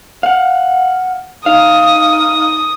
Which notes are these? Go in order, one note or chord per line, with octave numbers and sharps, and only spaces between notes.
F5 F#5
D#4 F5 D#6